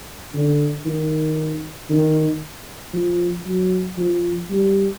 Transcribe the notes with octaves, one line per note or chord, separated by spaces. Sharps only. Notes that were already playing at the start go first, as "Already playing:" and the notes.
D3
D#3
D#3
F3
F#3
F3
G3